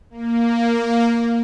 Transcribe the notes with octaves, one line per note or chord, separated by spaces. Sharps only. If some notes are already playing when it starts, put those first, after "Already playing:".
A#3